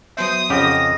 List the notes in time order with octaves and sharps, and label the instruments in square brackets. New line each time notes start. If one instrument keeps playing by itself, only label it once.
[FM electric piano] F#3 B3 E5 [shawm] C5 [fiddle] D#6
[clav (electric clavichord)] F2 C#3 G4 [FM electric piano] C#4 F#5 [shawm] D#5